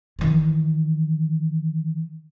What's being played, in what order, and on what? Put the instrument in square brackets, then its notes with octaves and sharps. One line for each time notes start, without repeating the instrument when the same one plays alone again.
[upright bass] D#3 E3